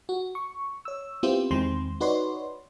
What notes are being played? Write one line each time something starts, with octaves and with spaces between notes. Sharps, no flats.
F#4
C#6
C#5 E6
B3 C4 E4 F4 G4 C5
E2 D#3 G#3 C4 C6
D#4 F#4 B4 C#5 D5 C6